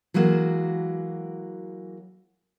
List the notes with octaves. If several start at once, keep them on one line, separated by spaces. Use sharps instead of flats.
E3 F#3 G#3 A#3 F#4